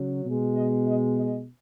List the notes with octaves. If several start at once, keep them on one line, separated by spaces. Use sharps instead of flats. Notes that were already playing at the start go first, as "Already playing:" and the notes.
Already playing: C#3 F#3
B2 G#3
D#5
D#5
D#5